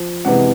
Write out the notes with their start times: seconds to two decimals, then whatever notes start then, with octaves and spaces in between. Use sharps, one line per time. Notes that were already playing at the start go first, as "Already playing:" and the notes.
Already playing: F3
0.25 F2 C3 E3 G#3 B3 F#5